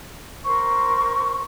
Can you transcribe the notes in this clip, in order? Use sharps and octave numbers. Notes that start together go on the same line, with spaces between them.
A#4 C5 C6 C#6